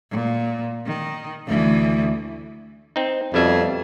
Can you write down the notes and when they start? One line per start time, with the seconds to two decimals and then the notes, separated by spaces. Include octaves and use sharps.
0.11 A#2
0.86 D#3
1.47 D2 E3
2.96 C4 D#4
3.34 F2 B2 G3 E5